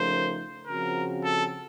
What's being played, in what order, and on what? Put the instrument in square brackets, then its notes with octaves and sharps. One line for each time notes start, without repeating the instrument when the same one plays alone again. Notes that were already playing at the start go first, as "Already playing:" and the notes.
Already playing: [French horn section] C#3 F3 A3 D#4 A#4 [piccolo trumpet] C5
[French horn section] C#3 F3 C4 F#4 [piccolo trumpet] A#4
[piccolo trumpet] A4